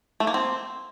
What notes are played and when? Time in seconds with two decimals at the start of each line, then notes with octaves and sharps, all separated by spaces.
0.20 A3
0.27 A#3
0.34 C4